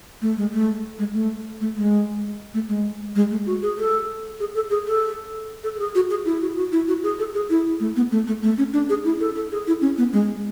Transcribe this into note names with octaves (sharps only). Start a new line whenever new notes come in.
A3
G#3
A3
G#3
A3
A3
G#3
A3
G#3
G#3
A3
F#4
G#4
A4
G#4
A4
G#4
A4
A4
A4
G#4
F#4
G#4
E4
F#4
F#4
E4
F#4
G#4
A4
G#4
E4
A3
B3
A3
A3
A3
C#4
D4
G#4
E4
A4
A4
G#4
E4
C#4
B3
G#3